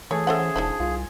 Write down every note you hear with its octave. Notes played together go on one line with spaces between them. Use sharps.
E3 A3 G#4 C#5
C#4 A4 C5 E5 F#5
E1 F3 D4 D#4
C2 F4